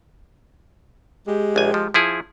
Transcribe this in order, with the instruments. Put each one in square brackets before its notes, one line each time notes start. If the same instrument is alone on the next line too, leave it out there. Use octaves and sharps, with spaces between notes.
[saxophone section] G#3 G4
[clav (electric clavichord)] A#1 G#5
F3
F3 E4 G#4